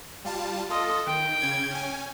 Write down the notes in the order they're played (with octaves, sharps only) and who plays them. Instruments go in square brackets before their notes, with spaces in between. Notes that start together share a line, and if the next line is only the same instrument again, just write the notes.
[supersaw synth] G3 F4 A5
[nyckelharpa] F4 D#5 [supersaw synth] A4
[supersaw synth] D#3 [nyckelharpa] G5
[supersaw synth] C#3 G#6
C#4 G#5